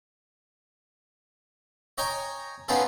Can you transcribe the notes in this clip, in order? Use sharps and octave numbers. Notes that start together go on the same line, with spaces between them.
C#5 D#5 G5 G#5 A#5
B3 C#4 D#4 F4 G#4 A4